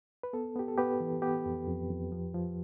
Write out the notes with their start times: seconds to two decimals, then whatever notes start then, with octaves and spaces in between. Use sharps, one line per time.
0.23 B4
0.33 B3 A4
0.56 B3 G4
0.68 A4
0.78 B3 G4 B4
1.00 E3
1.22 B3 G4 B4
1.46 F2
1.67 F2
1.90 F2
2.12 F3
2.34 F3